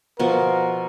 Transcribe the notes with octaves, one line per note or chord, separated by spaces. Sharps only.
B2 F3 A#4